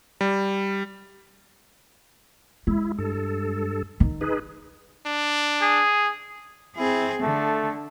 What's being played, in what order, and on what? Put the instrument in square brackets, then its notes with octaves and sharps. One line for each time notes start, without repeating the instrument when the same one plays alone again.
[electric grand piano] G3
[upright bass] G#3 [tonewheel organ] E4
[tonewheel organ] G2 A4
[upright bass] D#3
[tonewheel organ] D#4 G#4 B4
[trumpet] D4
[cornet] G#4
[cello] C4 G#4 [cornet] E4
[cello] D3 [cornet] A3